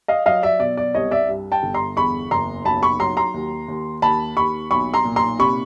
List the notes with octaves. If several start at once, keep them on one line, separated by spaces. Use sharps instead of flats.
D#5 F5
F#3 D#5 F5
D5 E5
B2 D5
D5
C2 C#5 D#5
D5 E5
G2
G5 A5
G1
A#5 C6
E2 B5 C#6
F#1 A#5 C6
B1 A5 B5
B5 C#6
F#3 A#5 C6
A#5 C6
D#2
D#2
D#2 A5 B5
D#2 B5 C#6
B1 B5 C#6
A#5 C6
A#2
A#5 C6
C3 B5 C#6